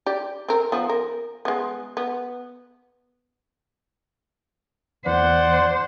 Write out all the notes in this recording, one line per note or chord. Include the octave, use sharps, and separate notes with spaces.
G4 D5
C4 A#4
F3 B3
A#4
G#3 B3
B3
E2 C5 D5 F#5